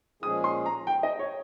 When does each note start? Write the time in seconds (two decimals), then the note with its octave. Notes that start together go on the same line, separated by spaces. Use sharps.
0.22 A#2 F3 G#3 C#4 G#4 D#6
0.44 C6
0.66 A#5
0.87 G5
1.03 D#5
1.19 C#5